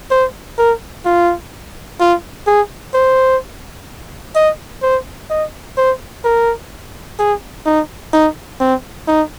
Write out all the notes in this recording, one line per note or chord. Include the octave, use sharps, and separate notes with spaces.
C5
A#4
F4
F4
G#4
C5
D#5
C5
D#5
C5
A#4
G#4
D#4
D#4
C4
D#4